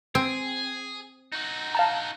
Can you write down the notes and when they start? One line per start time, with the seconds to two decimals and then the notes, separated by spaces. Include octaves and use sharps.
0.15 C4 G#4
1.32 D#4 F#4
1.75 F5 A5 A#5